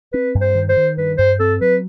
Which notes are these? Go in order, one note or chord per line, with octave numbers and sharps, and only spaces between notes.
C4 B4
G2
C5
D#3
C5
D#3
G2 B4
G2 C5
C4 A4
F#3 B4